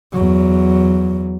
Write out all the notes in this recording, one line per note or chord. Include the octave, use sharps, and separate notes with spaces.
E2 F#3